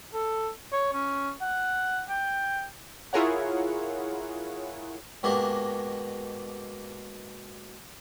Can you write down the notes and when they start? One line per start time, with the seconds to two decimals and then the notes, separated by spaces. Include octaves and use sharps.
0.13 A4
0.72 C#5
0.93 C#4
1.41 F#5
2.09 G5
3.13 E4 F4 G#4 A#4 C#5 F#5
5.23 G#2 B2 A#3 D4 G4